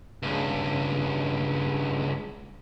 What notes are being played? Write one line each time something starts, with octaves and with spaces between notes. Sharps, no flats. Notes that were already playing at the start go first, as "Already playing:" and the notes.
C#2 G2